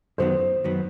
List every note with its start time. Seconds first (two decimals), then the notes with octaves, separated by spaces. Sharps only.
0.18 F#2 D#3 F#3 B3 C5
0.64 F#2 D#3 F#3 B3